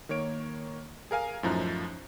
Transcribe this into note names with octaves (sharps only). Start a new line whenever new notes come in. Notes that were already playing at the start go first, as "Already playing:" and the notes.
D#3 A#3 C#5 D7
G#4 A#4 F5 G#5
F#2 A2 F3 D#4 A#5 F#6